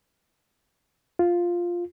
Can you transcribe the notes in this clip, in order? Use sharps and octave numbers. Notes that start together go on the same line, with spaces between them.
F4